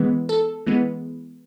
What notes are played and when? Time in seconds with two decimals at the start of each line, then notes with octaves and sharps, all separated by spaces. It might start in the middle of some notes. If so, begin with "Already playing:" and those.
Already playing: E3 G#3 B3
0.29 A4
0.66 E3 G#3 B3